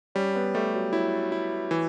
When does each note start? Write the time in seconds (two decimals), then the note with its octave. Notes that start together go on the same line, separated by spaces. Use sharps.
0.15 G3 C#4
0.35 B3
0.54 G3 A3
0.74 F#3
0.93 F#3 E4
1.32 E4
1.71 E3